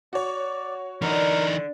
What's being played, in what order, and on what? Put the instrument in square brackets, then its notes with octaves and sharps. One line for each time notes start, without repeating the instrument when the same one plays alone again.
[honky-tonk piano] F#4 C#5 [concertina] D5
[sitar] D3 [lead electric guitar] E3 D#4 [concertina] A#4